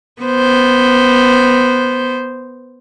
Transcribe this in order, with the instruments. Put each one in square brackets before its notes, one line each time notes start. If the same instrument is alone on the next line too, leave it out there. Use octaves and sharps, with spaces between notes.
[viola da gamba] B3 C5